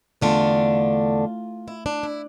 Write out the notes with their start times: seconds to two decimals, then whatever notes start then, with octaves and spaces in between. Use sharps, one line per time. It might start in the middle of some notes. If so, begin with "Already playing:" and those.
0.21 E2 D3 A3 D4 F4
1.68 E4
1.86 D4
2.03 E4